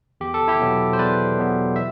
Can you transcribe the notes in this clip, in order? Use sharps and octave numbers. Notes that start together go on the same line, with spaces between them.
E2 G4
A4
E4 G4
B2 F#3 B3
C5
E2 B4 D5
B2 F#3 B3
E5